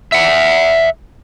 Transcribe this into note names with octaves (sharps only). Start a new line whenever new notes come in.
E5 F#5